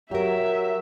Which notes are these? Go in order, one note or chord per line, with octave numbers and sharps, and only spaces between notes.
F#3 G4 A#4 E5